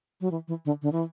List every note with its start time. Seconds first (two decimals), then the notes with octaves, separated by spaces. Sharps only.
0.21 F#3
0.31 E3
0.48 E3
0.65 D3
0.82 D3
0.92 E3